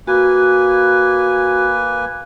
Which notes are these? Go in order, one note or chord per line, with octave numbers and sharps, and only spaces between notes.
A#3 F#4 B4 G#5